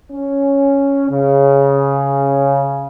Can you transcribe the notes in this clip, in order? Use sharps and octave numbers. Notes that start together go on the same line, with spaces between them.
C#4
C#3